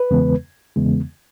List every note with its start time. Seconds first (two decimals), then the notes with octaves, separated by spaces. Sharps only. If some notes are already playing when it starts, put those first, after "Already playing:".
Already playing: B4
0.11 E2 C#3 E3 G#3 B3
0.76 E2 C#3 E3 G#3 B3